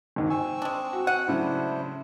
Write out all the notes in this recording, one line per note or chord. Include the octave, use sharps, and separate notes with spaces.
G#1 D#2 G#2
C4 G#5 C#6 E6
G#3 D4
F#4
F#5 D#7
A2 C#3 F#3 D4 E4 C5